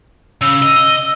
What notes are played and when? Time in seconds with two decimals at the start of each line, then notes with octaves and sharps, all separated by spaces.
0.41 C#3 E6
0.62 D#5